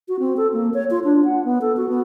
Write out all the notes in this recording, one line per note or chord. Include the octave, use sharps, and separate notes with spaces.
F#4
C4
A4
A#3
C#5
F4
D4
F#5
B3
A4
F#4
B3